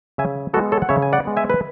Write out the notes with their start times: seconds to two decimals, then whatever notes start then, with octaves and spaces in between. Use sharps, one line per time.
0.18 C#3 E5 G#5
0.54 G#3 B3 F#4 A4
0.72 A4 C#5
0.82 F#5
0.89 C#3 C#5 E5
1.02 G#5
1.13 D5 F#5
1.25 G#3 B3
1.37 E5 G#5
1.50 B4